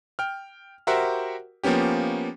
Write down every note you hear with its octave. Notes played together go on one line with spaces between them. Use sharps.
G5 F6
F#4 G4 A#4 C5 E5 F#5
F3 A#3 B3 C#4 G4